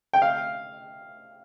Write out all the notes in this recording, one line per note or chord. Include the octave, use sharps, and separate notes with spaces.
G5
F5